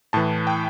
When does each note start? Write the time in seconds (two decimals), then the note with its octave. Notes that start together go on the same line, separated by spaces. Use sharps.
0.13 A2 E3 A5
0.47 G5